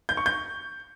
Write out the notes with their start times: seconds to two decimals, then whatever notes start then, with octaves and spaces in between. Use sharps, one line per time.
0.09 G6
0.17 C#6
0.26 G6